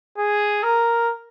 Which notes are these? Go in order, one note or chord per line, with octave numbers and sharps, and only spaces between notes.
G#4
A#4